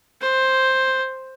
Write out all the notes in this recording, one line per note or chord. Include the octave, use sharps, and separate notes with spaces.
C5